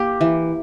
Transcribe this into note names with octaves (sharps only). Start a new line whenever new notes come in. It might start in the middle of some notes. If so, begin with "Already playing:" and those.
Already playing: A#3 G4
E3